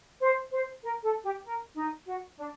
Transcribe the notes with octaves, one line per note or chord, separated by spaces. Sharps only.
C5
C5
A#4
A4
G4
A#4
D#4
F#4
D4